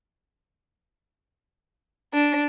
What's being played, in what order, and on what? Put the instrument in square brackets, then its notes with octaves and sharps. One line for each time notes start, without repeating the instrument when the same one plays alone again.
[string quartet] D4